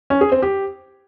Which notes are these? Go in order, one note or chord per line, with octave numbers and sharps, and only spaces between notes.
C#4
G#4
C4
G4